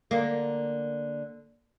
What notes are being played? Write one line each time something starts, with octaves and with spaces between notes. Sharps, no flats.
D3 A#3